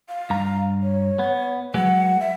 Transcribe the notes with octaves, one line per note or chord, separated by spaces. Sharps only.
F5
G2 A#5
C#5
B3
F#3 G#3 B4 F#5
E5